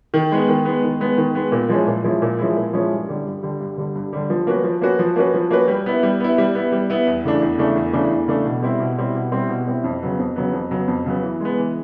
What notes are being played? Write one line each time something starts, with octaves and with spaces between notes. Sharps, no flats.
D#3
G#3 B3
D#3
G#3 B3
D#3
G#3 B3
D#3
G#3 B3
A#2
F3 G#3 C#4 E4
A#2
F3 G#3 C#4 E4
A#2
F3 G#3 C#4 E4
A#2
F3 G#3 C#4 E4
G2
D3 G3
G2
D3 G3
G2
D3 G3
G2
D3 G3
F3
A#3 C#4 F#4 B4
F3
A#3 C#4 F#4 B4
F3
A#3 C#4 F#4 B4
F3
A#3 C#4 F#4 B4
G3
B3 E4
G3
B3 E4
G3
B3 E4
G3
B3 E4
E2
C#3 E3 A3 D4
E2
C#3 E3 A3 D4
E2
C#3 E3 A3 D4
E2
C#3 E3 A3 D4
B2
G3 C4 E4
B2
G3 C4 E4
B2
G3 C4 E4
B2
G3 C4 E4
F2
C#3 F#3 B3
F2
C#3 F#3 B3
F2
C#3 F#3 B3
F2
C#3 F#3 B3
E3
G#3 B3
E3